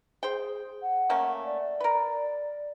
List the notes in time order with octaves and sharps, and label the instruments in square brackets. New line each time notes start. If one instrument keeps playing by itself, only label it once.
[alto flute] G#4 [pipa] C5 G5
[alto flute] F#5
[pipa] A3 A#3 C#4
[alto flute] D5
[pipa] A#4 B4